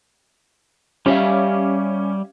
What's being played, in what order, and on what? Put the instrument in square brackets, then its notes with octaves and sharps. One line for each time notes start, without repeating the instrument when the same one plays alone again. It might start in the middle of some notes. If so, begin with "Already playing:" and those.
[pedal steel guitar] G3 [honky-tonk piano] C#4 [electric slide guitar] G4 E5 F5